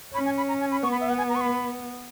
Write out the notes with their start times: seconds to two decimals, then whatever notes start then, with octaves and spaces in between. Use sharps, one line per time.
0.14 C#4 B5
0.25 G#5
0.37 B5
0.48 A#5
0.61 G#5
0.71 B5
0.83 B3 C#6
0.92 B5
1.01 E5
1.09 F#5
1.18 G#5
1.29 A#5
1.36 C#6
1.41 B5